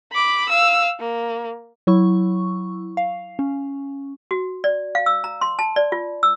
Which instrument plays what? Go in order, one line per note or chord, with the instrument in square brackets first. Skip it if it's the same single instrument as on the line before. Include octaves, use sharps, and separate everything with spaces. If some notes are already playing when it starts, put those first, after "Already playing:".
[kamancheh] B5 D6
F5 E6
A#3
[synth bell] F#3 E4 C#6
F5
C#4
[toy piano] F#4
D5
F5
E6
A#5
C6
A5
D5
F4
E6